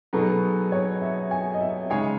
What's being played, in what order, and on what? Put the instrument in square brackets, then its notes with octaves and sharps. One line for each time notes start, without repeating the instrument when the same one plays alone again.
[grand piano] B2 F#3 B3 D#4 G#4 [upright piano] A4
[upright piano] C#5
E5
G#5
D#5
E5
[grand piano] C#3 G#3 D#4 G#4 C#5 [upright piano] G#5